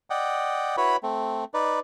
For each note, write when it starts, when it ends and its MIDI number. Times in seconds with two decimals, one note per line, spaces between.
0.10 0.76 74
0.10 0.76 75
0.10 0.76 78
0.10 0.76 79
0.77 0.97 64
0.77 0.97 66
0.77 0.97 71
0.77 0.97 73
0.77 0.97 83
1.03 1.44 57
1.03 1.44 60
1.54 1.80 63
1.54 1.80 71
1.54 1.80 74